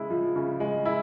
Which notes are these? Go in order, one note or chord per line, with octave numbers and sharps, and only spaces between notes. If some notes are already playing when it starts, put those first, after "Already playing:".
Already playing: C#3 G#3 E4
F3
C#3
G#3
E4